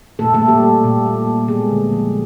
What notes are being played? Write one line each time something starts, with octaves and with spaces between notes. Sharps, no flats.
A#2 A3 A4
A3 A4
A#3
G3 G4
A#3
A#2
G3
G3
G#3 B3 G#4
D3
F3